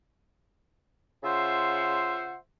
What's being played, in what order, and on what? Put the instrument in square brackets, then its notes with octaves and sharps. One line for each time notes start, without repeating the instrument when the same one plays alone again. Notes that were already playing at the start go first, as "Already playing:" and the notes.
[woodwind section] C#3 F4 C5 E5 F#5